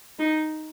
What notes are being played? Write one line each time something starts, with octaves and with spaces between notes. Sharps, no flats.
D#4